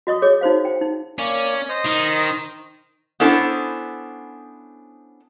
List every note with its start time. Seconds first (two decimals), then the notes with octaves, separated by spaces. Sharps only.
0.07 F#4 D#5 C#6 D#6
0.22 G#4 C#5 D6
0.41 D#4 F#4 C5 F5
0.65 G5
0.81 D#4
1.18 A#3 C#4 D5
1.69 C5 D#5 D#6
1.85 D#3
3.20 B3 C#4 D4 E4 A4 C5